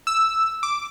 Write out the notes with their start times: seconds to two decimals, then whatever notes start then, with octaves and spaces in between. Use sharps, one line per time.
0.07 E6
0.63 D6